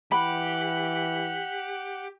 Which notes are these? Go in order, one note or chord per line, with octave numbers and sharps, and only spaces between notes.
E3 G4 F#5 B5